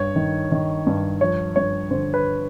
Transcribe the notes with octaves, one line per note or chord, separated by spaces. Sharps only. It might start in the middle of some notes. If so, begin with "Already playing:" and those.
Already playing: G2 C#5
D#3
D#3
G2
F3 C#5
G2 C#5
D3 C5
B4